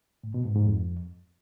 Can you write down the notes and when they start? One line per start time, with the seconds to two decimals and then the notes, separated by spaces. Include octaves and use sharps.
0.24 A2
0.34 B2
0.45 G#2
0.56 G#2
0.67 F2